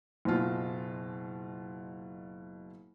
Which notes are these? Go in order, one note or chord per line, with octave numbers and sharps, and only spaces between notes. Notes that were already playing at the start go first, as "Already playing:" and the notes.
F#1 B2 F4